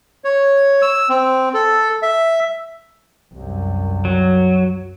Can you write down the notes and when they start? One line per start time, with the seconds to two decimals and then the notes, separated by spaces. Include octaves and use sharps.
0.24 C#5
0.82 E6
1.09 C4
1.54 A4
2.02 E5
3.34 C2 F#2
4.05 F#3